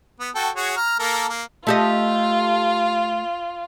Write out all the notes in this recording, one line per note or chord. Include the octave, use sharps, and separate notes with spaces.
B3
F#4 A4 G5
F#4 G#4 C#5
A#5 F6
A#3 A4 A#4
A#3
A3 F4 G4 D#5